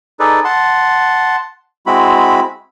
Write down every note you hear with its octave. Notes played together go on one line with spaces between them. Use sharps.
D#4 G#4 A4 B4 D5
F#5 A5 C6
G#3 C4 E4 F#4 B5